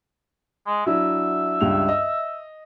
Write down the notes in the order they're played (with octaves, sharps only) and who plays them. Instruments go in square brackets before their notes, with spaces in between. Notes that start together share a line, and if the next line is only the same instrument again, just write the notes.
[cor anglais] G#3
[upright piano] F#3 D4 E4 [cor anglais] E5
[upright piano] C#2 G2 F7
D#5